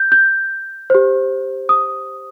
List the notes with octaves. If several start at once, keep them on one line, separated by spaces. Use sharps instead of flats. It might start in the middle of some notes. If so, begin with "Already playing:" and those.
Already playing: G6
G6
G4 C5
D#6